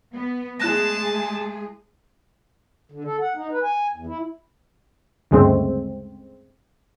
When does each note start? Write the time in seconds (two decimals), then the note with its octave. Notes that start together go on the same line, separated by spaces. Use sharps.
0.14 B3
0.60 G#3 A3 E4 G#4 A5 F#6 A#6
2.92 D3
3.04 A4
3.21 F#5
3.36 D#4
3.51 B4
3.63 G#5
3.93 E2
4.07 E4
5.31 D2 G2 C#3 G#3 A3 C4